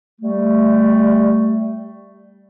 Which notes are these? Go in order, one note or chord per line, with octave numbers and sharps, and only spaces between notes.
G3 A3